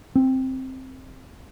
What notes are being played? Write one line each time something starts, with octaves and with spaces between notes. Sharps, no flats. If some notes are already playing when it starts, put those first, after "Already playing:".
C4